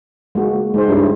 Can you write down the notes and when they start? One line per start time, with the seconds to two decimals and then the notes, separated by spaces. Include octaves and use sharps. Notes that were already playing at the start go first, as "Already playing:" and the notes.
0.35 G#3 A#3 F#4
0.74 G#3 D#4 C5
0.89 G2 C#4 D#4 E4